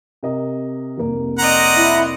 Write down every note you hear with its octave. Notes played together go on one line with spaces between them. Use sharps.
C3 A#4 D#5
F1 C2 A#3
C4 D5 D#5 F#5 A#5
E4 E5